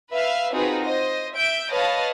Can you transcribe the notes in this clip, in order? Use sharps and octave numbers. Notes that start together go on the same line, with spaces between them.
B4 E5 F5
C4 D#4 F4 F#4 G#4 B4
C5 D#5
E5 G6 D7
B4 C#5 D#5 F5 A5